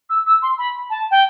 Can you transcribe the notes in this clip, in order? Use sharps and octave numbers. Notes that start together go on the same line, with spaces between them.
E6
E6
C6
B5
A5
G5